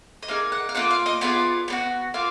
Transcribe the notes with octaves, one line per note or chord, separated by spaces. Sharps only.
D#5
A#3 D#4 G#4 F5
F#5
F5
A#3 D4 F4 F#5
F5
D#5
B3 F4 G#4 D5
B3 D4 F#4
A#3 F4 F5